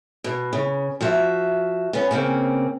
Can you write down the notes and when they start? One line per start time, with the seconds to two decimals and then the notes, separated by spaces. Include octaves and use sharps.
0.24 B2
0.53 C#3
1.01 F3 F#4 E5
1.93 B3 C#4
2.11 C#3 A#3 C4